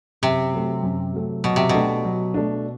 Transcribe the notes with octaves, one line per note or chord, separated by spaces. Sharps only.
F#2 C3
F#3 A3
F#2
F#3 A3
B2 F#3
C3
B2 A3 D4
F#3
A3 D4